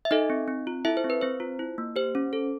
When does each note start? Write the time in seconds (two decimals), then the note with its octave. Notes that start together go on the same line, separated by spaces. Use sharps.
0.05 E5
0.11 D#4 A4 D#5
0.30 C4
0.48 C4
0.67 F4
0.85 E4 A4 E5
0.97 C5
1.04 C4
1.10 B4
1.21 C4 C5
1.40 F4
1.59 E4
1.78 A#3
1.96 G4 C5
2.15 C#4
2.33 A4